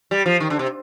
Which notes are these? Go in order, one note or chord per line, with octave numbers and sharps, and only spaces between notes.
G3
F3
D#3
D3
C3